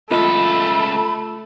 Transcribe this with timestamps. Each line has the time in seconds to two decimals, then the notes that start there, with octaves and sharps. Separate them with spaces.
0.11 C#2 A3 F4 A4 D#5 B5